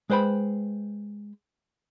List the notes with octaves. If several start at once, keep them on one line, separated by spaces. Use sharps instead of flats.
G#3 B4 C5 G5 B5